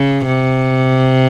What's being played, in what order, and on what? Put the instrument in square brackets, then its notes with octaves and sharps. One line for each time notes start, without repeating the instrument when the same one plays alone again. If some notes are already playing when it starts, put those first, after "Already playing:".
Already playing: [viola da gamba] C#3
C3